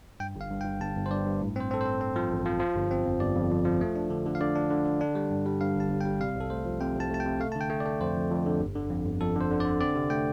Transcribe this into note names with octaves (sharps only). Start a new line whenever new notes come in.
G2 G5
G1
F5
G2
G5
G2
G1 A5
G1
C5
G2 D5
G2
A2
C4 C5
C4 A4
C5
C4
C4
F3
A1
F3
F3
G1
C4
F2
G1 D5
F2
F2
F3
A3
D4
D3
D3
F5
D3 D5
D4
D3
D3
D4
G3
G2
G3
G2 F5
G1 A5
G1
G5
G3
C3 F5
C2 A4
A3 C5
F3
C3 G5
C2 A5
A3 A5
G5
C3
A3 F5
D3 A5
G5
A3
D5
A3
F2 C5
F2
F2
D3
G1
D3
F2
G1
F2 A4
D3 C5
D3
D5
D3
C4 D5
C3
A3 G5